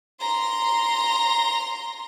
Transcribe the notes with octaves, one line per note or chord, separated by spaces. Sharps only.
A#5 C6